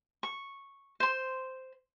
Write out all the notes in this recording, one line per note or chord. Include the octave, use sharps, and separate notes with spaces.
C#6
C5 C6